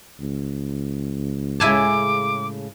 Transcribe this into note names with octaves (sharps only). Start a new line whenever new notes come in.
C#2
A2 C#3 G#3 E4 G#5 A5 D6